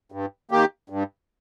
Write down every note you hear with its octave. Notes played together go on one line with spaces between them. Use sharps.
G2
D#3 A#3 G4
G2